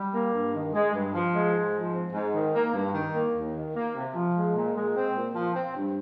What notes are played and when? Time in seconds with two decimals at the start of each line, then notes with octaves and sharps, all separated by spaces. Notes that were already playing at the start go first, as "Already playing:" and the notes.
Already playing: G3
0.13 A#3
0.33 G2
0.53 D#3
0.73 G#3
0.93 G2
1.13 F3
1.34 G#3
1.54 G#2
1.74 F3
1.93 C4
2.13 G#2
2.34 D#3
2.54 A#3
2.73 G2
2.94 D#3
3.14 A#3
3.34 D#2
3.54 D#3
3.75 A#3
3.94 C3
4.14 F3
4.34 G#3
4.54 A#2
4.75 G#3
4.95 C4
5.15 A#2
5.35 F3
5.55 C4
5.75 G2